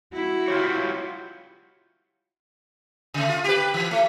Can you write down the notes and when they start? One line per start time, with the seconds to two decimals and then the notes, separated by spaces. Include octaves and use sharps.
0.13 E4 F#4
0.48 F4 G4 C#5
3.14 C#3 A3
3.29 F4
3.44 G4 B4
3.74 E3
3.91 A3